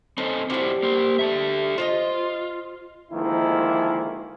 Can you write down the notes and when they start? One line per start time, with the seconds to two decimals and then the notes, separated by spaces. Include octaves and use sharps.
0.18 C4 C#4 D#4 A4
0.50 G3 E4 F#4 G4 C5
0.83 A#3 C5
1.19 D3 A3 E5
1.78 F4 C5 C#5 D#5
3.12 D2 D#3 F3 G#3 A#3 E4